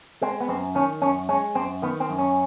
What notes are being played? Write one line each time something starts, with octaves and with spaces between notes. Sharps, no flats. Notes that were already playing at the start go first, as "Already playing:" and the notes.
G#3 C4
B3
F#2 C4
D#3 C#4
F#2 C#4
G#3 C#4
F#2 C4
D#3 B3
C4
F#2
C#4